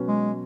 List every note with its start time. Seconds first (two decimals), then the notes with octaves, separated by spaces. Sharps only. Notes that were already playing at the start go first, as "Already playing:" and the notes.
Already playing: B2 F#3 C#4 F#4 B4
0.08 G#3